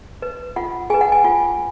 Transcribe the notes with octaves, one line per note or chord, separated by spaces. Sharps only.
B4
F4 F#5
G#4 B4 G#5
F#5
G#5
F4